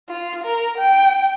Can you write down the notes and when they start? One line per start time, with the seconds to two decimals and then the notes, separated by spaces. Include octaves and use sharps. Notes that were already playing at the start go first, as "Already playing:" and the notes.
0.09 F4
0.44 A#4
0.78 G5